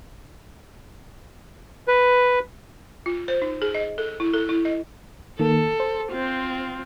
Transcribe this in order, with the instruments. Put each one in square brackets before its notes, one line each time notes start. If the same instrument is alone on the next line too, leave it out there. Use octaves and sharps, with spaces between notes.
[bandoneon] B4
[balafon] F4
C5
D#4
G#4
D#5
A4
E4
A4
E4
D#5
[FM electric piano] D#3 A#3 [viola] A4
[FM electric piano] C5
[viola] C4 F4